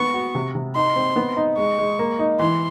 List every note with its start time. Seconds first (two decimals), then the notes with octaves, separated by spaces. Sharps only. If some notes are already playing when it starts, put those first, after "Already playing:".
Already playing: B3 C#6
0.14 F#4
0.35 C3
0.55 C3
0.75 D#4 C6
0.96 C4
1.16 B3
1.37 D#4
1.58 G#3 C#6
1.79 G#3
1.99 A#3
2.19 D#4
2.39 E3 C6